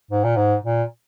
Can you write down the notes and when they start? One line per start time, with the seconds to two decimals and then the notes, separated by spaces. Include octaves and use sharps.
0.11 G#2
0.24 A#2
0.36 G#2
0.64 A#2